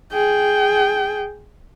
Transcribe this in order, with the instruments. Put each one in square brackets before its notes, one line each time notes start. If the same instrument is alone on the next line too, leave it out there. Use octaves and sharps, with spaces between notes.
[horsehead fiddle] G#4 G5